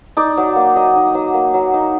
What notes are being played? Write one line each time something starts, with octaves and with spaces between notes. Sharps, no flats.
D#4 D5
F#3
A#3
F#3 D#5
D#4
F#3
A#3
F#3
D#4